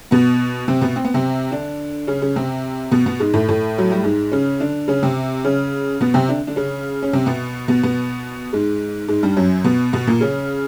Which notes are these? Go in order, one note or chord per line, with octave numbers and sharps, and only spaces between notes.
B2 B3
C3 C4
B2 B3
C4
B3
C3 C4
D3 D4
C#3 C#4
C#3 C#4
C3 C4
B2 B3
B2 B3
G#2 G#3
A2 A3
A2 A3
F#3
G3
G#2 G#3
C#3 C#4
D3 D4
C#3 C#4
C3 C4
C#3 C#4
B2 B3
C3 C4
D3 D4
D3 D4
C#3 C#4
C#4
C3 C4
B2 B3
B2 B3
B2 B3
G#2 G#3
G#2 G#3
G2 G3
F#2 F#3
B2 B3
B2 B3
A#2 A#3
C#3 C#4